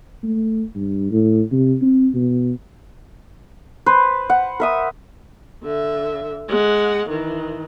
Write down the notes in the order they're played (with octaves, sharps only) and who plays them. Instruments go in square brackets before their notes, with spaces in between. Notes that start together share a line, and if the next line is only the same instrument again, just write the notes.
[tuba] A3
G2
A2
C3
C4
B2
[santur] B4 C5
F#5
A#4 E5 D#6
[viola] D3 E5
G#3 F#5
D#3 E3